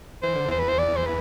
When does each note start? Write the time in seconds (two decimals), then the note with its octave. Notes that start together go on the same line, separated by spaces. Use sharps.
0.22 E3 C5
0.35 D3
0.47 E2 E3 C5
0.59 B4
0.68 C5
0.78 D5
0.96 C5
1.06 B4